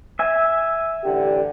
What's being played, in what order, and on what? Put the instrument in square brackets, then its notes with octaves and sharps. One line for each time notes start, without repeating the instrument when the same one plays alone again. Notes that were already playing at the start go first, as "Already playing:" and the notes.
[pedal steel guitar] E5 G#5
[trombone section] A1 D3 G4